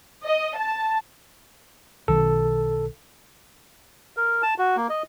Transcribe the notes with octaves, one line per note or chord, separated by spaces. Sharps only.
D#5
A5
B1 D#3 A4
A#4
A5
F#4
A#3
D#5